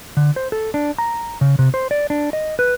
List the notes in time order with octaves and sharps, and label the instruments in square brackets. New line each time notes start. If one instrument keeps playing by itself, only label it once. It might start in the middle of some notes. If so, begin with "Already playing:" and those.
[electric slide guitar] D3
C5
A4
D4
A#5
C#3
C3
C5
D5
D4
D#5
B4